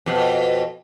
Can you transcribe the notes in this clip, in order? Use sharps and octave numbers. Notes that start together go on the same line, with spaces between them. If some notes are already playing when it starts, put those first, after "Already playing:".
F2 B2